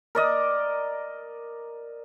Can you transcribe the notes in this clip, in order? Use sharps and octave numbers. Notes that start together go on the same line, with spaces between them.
A#4 D5 D#5